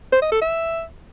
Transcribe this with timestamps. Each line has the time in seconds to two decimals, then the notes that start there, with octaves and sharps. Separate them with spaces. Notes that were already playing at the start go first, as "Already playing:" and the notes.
0.12 C5
0.22 D#5
0.32 A4
0.42 E5